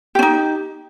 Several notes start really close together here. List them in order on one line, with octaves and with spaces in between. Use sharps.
G4 C#4 D#4